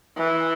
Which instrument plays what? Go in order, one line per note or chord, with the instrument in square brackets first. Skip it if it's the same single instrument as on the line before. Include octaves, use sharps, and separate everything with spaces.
[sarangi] E3